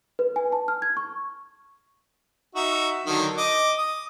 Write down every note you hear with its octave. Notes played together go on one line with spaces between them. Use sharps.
B4
G#5
A5
F6
G#6
C#6
D#4 F#4 E5
D3 D#3 F#3
D#5 D6
D#6